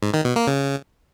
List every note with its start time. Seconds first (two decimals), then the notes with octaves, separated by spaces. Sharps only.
0.03 G#2
0.14 D#3
0.25 B2
0.36 A#3
0.47 C#3